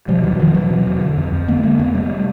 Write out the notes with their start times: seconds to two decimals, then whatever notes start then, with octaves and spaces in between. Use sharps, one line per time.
0.08 B2 F3 G3
0.24 E2 E3 F#3
0.39 E2 D#3 F3
0.54 B2 E3 F#3
0.70 B2
0.86 E2
1.02 D3
1.17 F2
1.32 F2
1.48 D3 A3 B3
1.63 D3 G#3 A#3
1.79 F2 A3 B3
1.94 C3 G3 A3